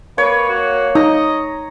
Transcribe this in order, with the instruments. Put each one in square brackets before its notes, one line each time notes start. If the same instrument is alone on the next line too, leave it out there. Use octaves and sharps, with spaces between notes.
[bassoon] A#3 [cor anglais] B4 [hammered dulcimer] C#5
[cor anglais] F#4
[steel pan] D#4 [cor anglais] D#5 [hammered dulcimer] A#5